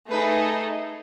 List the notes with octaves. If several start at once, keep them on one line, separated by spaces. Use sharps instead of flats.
A3 D#4 G#4 B4